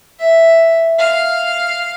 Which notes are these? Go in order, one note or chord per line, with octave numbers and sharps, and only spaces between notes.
E5
F5